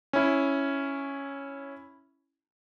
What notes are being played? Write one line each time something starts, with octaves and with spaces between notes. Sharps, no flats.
C#4 E4